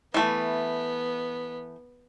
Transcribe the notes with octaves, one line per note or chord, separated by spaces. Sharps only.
E3 A3 B3